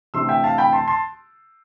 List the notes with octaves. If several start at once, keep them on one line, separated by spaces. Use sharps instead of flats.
C3 E3 A3 D4 C6 E6
E5 G5
F5 A5
G5 B5
A5 C6
A5 C6